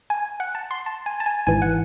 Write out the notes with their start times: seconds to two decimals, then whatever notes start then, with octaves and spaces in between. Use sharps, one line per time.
0.10 G#5
0.40 F#5
0.55 A5
0.71 C6
0.86 A5
1.06 G#5
1.20 A5
1.26 G#5
1.47 G#1 G#2 E3 G#5
1.62 F#5